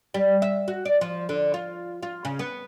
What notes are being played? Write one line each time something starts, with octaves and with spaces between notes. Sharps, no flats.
G3
E5
F#4
D5
F3
D3
F4
F4
C#3
B3